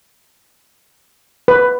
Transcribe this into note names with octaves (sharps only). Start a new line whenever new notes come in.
B4